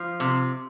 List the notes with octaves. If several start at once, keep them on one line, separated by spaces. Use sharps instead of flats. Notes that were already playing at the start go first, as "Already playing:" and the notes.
Already playing: F3
C3